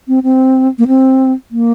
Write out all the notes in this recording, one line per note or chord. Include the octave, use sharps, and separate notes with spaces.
C4
C4
A#3
C4
A#3